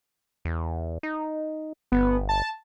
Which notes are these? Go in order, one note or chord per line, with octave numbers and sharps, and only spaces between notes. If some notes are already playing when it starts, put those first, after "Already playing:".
E2
D#4
G1 B3
A5